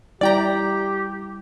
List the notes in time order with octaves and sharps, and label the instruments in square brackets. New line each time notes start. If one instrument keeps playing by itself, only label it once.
[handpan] G3 E4 [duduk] G4 [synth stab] D5 G5 A#5